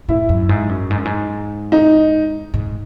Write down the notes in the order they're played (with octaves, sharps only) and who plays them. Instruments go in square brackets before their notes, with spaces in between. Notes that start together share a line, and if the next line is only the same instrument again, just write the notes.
[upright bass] A2 [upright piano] E4
[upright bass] F#2
G#2
F#2
G#2
F#2
G#2
[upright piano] D#4
[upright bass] G#2